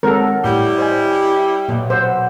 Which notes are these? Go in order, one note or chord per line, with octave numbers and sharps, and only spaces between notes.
D#3 G#3 C4 A4 A#4 C#5 F#5
A2 G3 E4
C5 D#5 G#5
B1 A#2 D#5
C5 F#5 E6